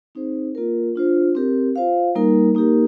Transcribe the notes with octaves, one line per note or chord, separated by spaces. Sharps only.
C4 D#4 G#4 C5
A#3 F4 A#4
D4 F4 C5
C4 G4 A#4
F4 C5 F5
G3 A#3 D#4 A#4
A#3 D#4 G4 A#4